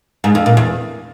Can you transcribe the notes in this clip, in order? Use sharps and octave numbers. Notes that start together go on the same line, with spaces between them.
G#2
F2
A#2
E2